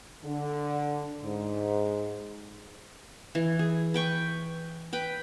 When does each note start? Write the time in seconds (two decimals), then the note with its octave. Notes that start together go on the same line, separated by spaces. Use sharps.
0.25 D3
1.23 G#2
3.35 E3
3.59 G#4
3.94 B4 G5 C#6
4.93 B4 G5